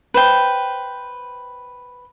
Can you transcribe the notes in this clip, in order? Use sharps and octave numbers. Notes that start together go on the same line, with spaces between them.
B4 C5 G5